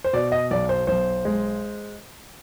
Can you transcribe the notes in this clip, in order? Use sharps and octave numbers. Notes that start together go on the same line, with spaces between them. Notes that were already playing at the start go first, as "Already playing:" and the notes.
C5
B2 D5
D#5
B1 D5
C5
B1 C5
G#3